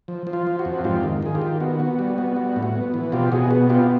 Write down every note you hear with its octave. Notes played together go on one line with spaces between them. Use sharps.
F3
F3
F4
F3
F#4
F2
G#2 F4 G4
D#3
D#3 G#4
F4 G4
D#3
B3 F#4
B3 F#4
G3 F#4
B3 F#4
G3 F#4
A2
F#4
B3
E3
B2 F4 G4
B2 F#4 G#4
B3 F#4
B3 F4 G4